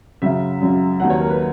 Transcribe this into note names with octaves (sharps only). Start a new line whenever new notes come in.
F#2 C#3 F#3 E5
F#2 C#3 F#3
D#2 D#3 F#3 F#5
C#5
A#4
B4